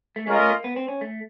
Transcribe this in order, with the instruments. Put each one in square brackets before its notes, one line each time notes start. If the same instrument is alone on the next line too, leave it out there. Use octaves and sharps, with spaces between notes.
[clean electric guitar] A3
[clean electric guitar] G#3 [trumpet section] C#4 F4 A#4 D#5
[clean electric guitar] A3
A#3
B3
C4
C#4
A3